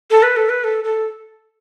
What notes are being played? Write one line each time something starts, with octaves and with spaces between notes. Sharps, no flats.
A4
B4
A4
B4
A4
A4